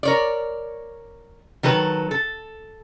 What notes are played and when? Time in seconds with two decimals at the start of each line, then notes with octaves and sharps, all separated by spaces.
0.03 A#4 C#5 D5
1.63 D#3 F#3 A4 B4
2.11 A4